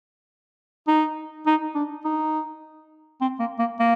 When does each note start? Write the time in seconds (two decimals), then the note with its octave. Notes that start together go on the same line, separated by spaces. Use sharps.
0.88 D#4
1.46 D#4
1.75 D4
2.05 D#4
3.21 C4
3.39 A#3
3.59 A#3
3.79 A#3